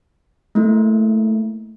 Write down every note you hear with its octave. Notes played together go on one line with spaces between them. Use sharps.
A3 A#3 E4